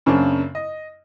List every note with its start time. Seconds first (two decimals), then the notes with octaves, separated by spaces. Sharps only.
0.06 F#2 C#3 A#3 C4 D4
0.55 D#5